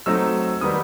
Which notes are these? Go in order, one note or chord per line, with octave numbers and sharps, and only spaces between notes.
F#3 A3 C4 D#4 E6
D#3 G3 B3 D#4 D#6